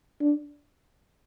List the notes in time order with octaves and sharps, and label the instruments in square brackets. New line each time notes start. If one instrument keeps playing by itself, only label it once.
[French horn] D4